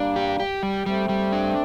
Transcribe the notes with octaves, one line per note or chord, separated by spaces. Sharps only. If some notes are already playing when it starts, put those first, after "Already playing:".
Already playing: G3 A#3 D4
G4
G4
G3
G3 A3 C4
G3
D4